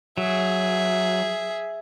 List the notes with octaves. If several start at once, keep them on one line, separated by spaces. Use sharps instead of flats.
F#3 G#4 E5